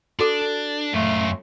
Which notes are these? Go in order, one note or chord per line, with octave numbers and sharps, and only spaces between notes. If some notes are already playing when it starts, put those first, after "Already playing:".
D4 F#4 A4 D6
F#2 A3 F4